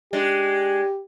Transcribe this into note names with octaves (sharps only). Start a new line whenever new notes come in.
G#3 D4 G4